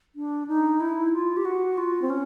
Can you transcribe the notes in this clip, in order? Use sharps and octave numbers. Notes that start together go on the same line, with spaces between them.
D4
D#4
E4
F4
G4
F#4
F4
C4
C#4